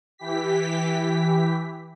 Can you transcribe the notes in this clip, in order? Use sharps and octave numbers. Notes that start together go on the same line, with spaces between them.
E3 G4 B6